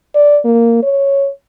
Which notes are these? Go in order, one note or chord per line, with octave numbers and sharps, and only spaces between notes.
D5
A#3
C#5